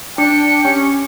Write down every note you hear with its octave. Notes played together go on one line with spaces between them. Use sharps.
D4 G5 C#7
C#4 G4